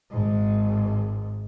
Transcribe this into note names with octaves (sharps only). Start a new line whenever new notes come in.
G#1 G#2